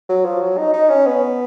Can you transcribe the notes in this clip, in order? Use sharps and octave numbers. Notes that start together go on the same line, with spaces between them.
F#3
F3
F#3
D#4
D#4
C#4
B3